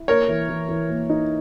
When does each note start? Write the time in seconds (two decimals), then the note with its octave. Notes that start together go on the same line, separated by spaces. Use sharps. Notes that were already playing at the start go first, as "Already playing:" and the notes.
Already playing: E4
0.08 A#3 A#4 C#5
0.28 E3
0.49 E3
0.69 E3
0.89 A#3
1.10 D#4